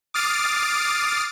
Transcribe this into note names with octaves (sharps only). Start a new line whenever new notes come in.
D6 D#6 F6 A6 C7 D7